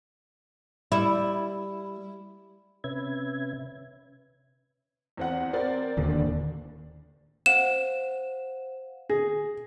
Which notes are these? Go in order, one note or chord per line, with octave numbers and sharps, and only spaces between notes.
G3 E4
C3 C#4 B4 E5 G#6
E2 C4 F#5
C4 A#4 D5
D1 D#2 D3 D4
C5 F5 F#5 E7
G#4 A#6